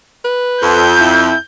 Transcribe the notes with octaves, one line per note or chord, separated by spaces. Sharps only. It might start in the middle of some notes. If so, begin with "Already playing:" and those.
B4
F2 G6
E4